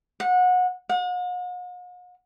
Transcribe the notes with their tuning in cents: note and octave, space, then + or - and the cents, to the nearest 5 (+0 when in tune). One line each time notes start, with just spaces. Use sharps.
F#5 -25
F#5 -45